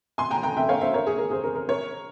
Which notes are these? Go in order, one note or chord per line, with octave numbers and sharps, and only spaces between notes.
G#5 C6
G5 A#5
G5 A#5
E5 G5
C#5 F5
C5 E5
A#4 C#5
G#4
A#4
G#4 C5
A#4
A#4
A#4 C#5